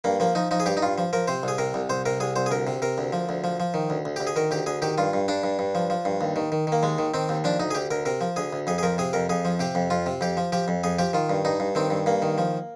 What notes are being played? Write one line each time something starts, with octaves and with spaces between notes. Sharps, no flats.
G2 A#3
F3 A#3
F3 D#4
F3 D#4
G#4
G2 G4
D#4
G2 F4
F3
F3 A#4
C3 C5
C2 G#4
C3 A#4
C2
C2 C5
C3 A#4
C2 G#4
C2 C5
G#4
D2 A#4
C3
C3 A#4
D2
F3
D2
F3
F3
D#3
D2
D2
D2 G4
G#4
D#3 A#4
D2 G4
D2 G#4
D#3 G4
G2 F4
G2
G2 D4
G2
G2
F3
F3
G2
D#2
D#3
D#3
D#3 A#3
D#2 G#3
D#3
D#3 C4
D#2
F3 D4
D2 D#4
G#4
D2 G4
D2 A#4
C3 A#4
F3
D2 G#4
D2
F2 G#4
G#4
F3 A#4
C3 G#4
F2 A#4
F2 G#4
F3
C3 G4
F2
F2 F4
C3
F2 G4
F3
F3 G4
F2
F2 G#4
F3 G4
D#3 F4
G2
G2 D#4
G2
D#3 C4
G2
G2 A#3
D#3
F3